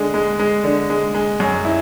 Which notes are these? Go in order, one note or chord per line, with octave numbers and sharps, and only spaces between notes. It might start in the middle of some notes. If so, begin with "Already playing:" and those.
Already playing: D3 G#3
G#3
G#3
D3
G#3
G#3
F#2
E4